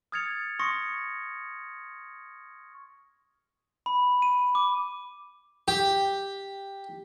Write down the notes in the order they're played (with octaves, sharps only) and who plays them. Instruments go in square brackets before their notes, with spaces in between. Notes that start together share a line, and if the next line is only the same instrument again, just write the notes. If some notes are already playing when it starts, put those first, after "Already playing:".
[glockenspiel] D#6 F6 G#6 A6 C#7 F7
C6 C#6 D#6 A#6 C#7
B5
D#7
D6
[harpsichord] G4